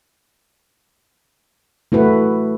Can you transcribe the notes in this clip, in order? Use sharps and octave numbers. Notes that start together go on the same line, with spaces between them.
A3 E4 F#4 B4